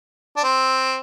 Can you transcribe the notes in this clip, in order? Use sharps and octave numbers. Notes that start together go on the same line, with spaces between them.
D4
C4